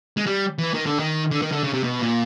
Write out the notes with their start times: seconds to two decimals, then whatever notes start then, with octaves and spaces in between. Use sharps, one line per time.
0.17 G#3
0.26 G3
0.58 E3
0.74 D#3
0.86 D3
0.99 D#3
1.31 D3
1.42 D#3
1.52 D3
1.63 C#3
1.73 C3
1.84 B2
2.00 A#2